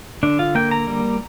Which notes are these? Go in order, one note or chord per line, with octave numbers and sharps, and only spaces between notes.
D3 D4
F4
A#3 G5
A#5
G3